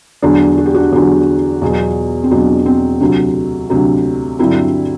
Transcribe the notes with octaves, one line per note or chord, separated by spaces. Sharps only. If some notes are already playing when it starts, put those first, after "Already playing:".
E2 D3 F#3 D4 F#4
F#4
G4
D4 F#4
E2 D3 F#3 D4
E2 B2 F#3
C4
E2 B2 F#3 D4
C4
D2 C3 F#3
D2 C3 F#3
G2 D3 F#3 C4 E4